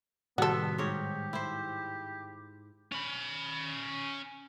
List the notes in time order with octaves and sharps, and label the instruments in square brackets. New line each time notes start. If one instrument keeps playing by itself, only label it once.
[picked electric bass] A2 D#3 G3 [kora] C3 C5 [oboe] B3 [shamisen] F#4 A4
[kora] G#2 D#4 C#5 [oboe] G4
[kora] E4 C5
[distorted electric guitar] C#4 B5